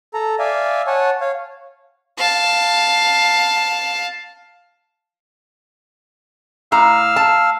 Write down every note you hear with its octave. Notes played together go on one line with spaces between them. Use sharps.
A4 A#5
D5 E5 F5 G#5
C#5 F#5 G#5 A5
C#5 F5
F5 A5
A2 F5 A#5 E6 F6
A5